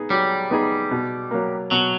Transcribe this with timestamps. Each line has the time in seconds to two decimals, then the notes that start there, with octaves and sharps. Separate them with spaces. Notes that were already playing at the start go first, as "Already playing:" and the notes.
Already playing: B3 D#4 G#4
0.10 F#3 G3
0.51 B3 D#4 G#4
0.91 B2
1.31 F#3 A#3
1.71 B2 F#3